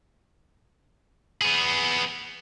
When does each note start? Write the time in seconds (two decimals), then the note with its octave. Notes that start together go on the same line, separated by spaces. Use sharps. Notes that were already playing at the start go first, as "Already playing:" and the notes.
1.42 B3 G#4